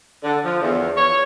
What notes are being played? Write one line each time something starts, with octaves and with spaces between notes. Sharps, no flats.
D3
F3
E2
C#5